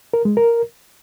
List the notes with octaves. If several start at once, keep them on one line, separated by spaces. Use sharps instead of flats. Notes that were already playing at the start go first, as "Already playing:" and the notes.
A#4
G#3
A#4